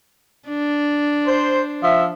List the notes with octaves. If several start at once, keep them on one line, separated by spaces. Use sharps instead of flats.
D4
C5
F3 E5